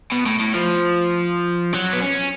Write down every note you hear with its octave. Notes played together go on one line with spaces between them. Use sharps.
B2
A2
A2
F3
F#3
B3
C#4